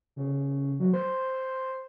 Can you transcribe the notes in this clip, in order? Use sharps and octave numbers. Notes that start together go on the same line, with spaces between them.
C#3
F#3
C5